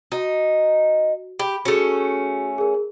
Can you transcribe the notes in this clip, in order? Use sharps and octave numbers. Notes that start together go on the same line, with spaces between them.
D#4 F#4
G4 B5
A3 C#4 F#4 G#4 A4
G#4 A#4